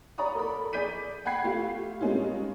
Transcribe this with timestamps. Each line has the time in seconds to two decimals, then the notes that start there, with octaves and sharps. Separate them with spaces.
0.18 C#5 D5 A#5 B5 C#6 D#6
0.35 A4 A#4 B5
0.73 G#4 D5 G6 B6 D#7
1.25 F#5 G5 B5 G#6 C7
1.44 A3 F4 G4 F5
2.01 G3 G#3 C4 C#4 D#4 F4